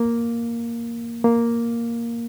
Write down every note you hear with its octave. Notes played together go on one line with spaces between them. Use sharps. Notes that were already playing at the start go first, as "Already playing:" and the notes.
Already playing: A#3
A#3